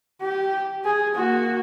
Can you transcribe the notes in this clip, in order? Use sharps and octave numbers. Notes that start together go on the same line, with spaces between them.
G4
G#4
A#3 F#4